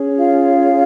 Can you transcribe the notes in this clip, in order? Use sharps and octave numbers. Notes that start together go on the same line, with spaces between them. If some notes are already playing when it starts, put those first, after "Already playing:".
Already playing: C#4 G#4 C#5
F4 F5